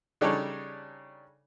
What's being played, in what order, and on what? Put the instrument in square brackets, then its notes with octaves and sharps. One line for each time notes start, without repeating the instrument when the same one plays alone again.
[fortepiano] C#3 G3 D4 D#4 A4 C#5